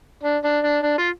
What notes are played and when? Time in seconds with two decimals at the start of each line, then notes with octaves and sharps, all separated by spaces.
0.23 D4
0.44 D4
0.64 D4
0.83 D4
0.98 F4